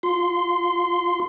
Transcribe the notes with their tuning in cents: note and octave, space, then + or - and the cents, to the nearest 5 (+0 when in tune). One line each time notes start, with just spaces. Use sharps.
F4 +20 C6 -10